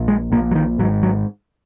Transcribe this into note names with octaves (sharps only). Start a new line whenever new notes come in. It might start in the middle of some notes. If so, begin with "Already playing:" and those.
Already playing: A#1 A#2
G#3
A#1 A#2 A#3
F#3
D#3
G#1 G#2 F#3
F#3